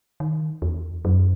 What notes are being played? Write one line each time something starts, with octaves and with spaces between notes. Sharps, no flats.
D#3
E2
F#2